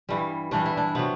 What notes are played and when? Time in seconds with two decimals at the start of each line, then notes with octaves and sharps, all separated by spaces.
0.09 G2 E3 G3
0.51 G2 E3 G3 D4
0.66 E4
0.77 D4
0.95 C3 F#3 B3